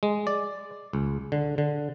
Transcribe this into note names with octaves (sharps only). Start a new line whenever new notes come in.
G#3
D5
C#2
D3
D3